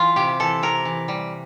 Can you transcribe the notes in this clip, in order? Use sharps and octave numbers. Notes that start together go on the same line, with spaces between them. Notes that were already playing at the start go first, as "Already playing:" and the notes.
Already playing: E3 F4
C3 G4
E3 A4
C3 A#4
E3
G3